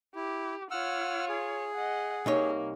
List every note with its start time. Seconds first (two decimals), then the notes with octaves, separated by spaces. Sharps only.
0.15 E4 G4
0.71 F4 C#5 F#5 E6 F6
1.29 G#4
1.75 D#5 F#5
2.26 C2 A#3 D#4 C#5